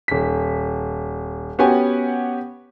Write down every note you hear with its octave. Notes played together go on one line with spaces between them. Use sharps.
D#1 B6
B3 C#4 F#4 G4 F#5 G#5